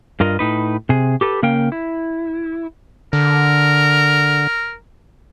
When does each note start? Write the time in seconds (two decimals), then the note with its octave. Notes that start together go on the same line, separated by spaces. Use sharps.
0.20 G2 F4 A#4 D#5
0.39 A2 D#4 B4
0.89 C3 G#4
1.21 G4 A4 B4
1.43 C#3 A#3 A#4 F5 G5
1.72 E4
3.13 D3 A#4